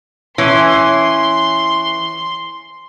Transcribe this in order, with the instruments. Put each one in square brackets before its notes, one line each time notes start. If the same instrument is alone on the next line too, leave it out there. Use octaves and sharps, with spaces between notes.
[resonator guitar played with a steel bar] E3 C#4 [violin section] C6